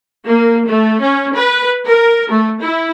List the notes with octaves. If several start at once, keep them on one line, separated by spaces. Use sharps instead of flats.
A#3
A3
C#4
B4
A#4
A3
E4